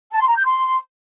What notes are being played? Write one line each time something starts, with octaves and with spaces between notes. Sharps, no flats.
A5
C6
A#5
G6
C6